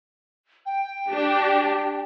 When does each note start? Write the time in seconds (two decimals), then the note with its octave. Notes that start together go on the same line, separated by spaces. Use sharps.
0.65 G5
1.09 D4 G4